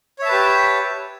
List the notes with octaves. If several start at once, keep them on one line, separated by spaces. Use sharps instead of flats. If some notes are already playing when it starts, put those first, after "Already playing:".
G4 B4 C#5 E5 A5